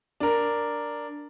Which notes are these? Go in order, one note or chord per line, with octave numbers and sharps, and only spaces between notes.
D4 A#4